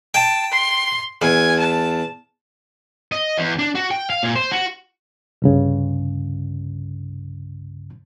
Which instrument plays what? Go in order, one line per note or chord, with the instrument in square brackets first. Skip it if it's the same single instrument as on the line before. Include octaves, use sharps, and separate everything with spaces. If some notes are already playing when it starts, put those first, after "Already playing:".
[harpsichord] G5 [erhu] A5
[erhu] C6
[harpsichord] E2 [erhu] G#5
[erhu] A5
[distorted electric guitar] D#5
E2
D4
F#4
G5
F5
A#2
C5
F#4
[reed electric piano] C2 G2 C#3